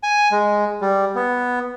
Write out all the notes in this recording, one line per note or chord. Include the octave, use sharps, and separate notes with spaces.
G#5
G#3
G3
B3